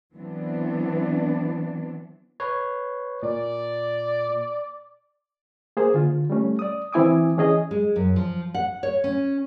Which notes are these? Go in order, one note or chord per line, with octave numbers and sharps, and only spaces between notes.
E3 F#3 B3 C4 D4
B4 C#5
A#2 D5
A#3 G#4 C5
D3 F4
G3 A3 C#4
D5 D#6
E3 C4 E4 G#5 D6 D#6
E3 C#4 G#4 D#5
G#3
F#2
F3
F#5
C#5
C#4